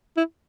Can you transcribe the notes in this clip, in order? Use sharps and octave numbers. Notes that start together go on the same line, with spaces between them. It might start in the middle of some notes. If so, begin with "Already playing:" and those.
E4